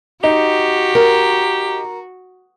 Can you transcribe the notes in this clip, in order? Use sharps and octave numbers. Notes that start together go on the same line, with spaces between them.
D#4 F#4 G4
A#4